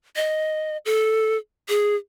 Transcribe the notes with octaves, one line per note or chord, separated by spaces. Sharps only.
D#5
A4
G#4